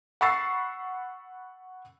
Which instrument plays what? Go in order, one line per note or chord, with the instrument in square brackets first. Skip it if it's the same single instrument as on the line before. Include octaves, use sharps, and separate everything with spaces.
[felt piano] F#5 B5 C#6 E6 A6 C7